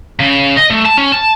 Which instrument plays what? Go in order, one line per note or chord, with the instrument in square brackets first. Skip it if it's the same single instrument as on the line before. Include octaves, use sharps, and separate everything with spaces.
[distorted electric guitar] C#3
D#5
A3
A5
C#4
A5